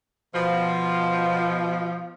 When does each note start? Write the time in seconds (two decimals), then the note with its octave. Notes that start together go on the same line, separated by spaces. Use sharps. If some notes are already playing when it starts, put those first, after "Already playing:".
0.34 B2 F3